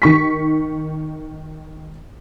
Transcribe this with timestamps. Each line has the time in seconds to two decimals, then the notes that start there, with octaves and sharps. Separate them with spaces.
0.02 D#3 C#6 B6